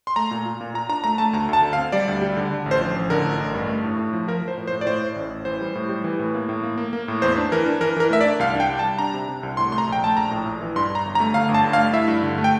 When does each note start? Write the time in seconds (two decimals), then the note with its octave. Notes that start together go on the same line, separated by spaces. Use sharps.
0.07 C6
0.16 A3 A#5
0.31 A#2
0.46 F4
0.61 A#2
0.74 F4 A#5
0.89 D4 A#5
1.04 A3 A#5
1.18 A3 A5
1.33 D2 A#5
1.49 D2 A5
1.62 D3
1.73 F5
1.78 C4
1.92 G3 D5
2.08 D2
2.22 G3
2.37 D3
2.51 D3
2.66 A1
2.71 C5
2.81 F3
2.96 A1
3.10 D3 A#4
3.24 A1
3.40 A1
3.54 G2
3.69 A3
3.84 A2
3.99 A2
4.13 F3
4.28 F3 A#4
4.43 F3
4.48 C5
4.57 A2
4.67 C5
4.72 A2
4.81 D5
4.86 A2 C5
5.02 A2
5.16 A1
5.30 A1
5.45 E3 C5
5.61 G3
5.75 A2
5.89 G3
6.04 E3
6.19 A2
6.35 A#3
6.49 A2
6.63 A#3
6.78 A#3
6.93 A#3
7.08 A2
7.22 E2 C5
7.37 D4
7.52 E3 A#4
7.66 D4
7.81 E3 A#4
7.96 E3 A#4
8.10 A3 E5
8.21 D5
8.25 D4
8.39 C2 F5
8.55 D4 G5
8.69 G3
8.79 A5
8.84 G3
8.99 D4 A#5
9.14 C3
9.29 C3
9.43 C2
9.57 A2 C6
9.72 A3 C6
9.78 A#5
9.87 A#1
9.92 G5
10.02 A3 A5
10.17 A#1 A#5
10.31 A2
10.46 A#1
10.61 E3
10.76 G2 C6
10.90 G2
10.95 A#5
11.05 G1
11.15 A#5
11.20 A3
11.34 D3 F5
11.49 G1
11.54 A5
11.64 G2
11.73 F5
11.78 A3
11.93 E4 E5
12.08 G2
12.23 D3
12.38 A3
12.44 G5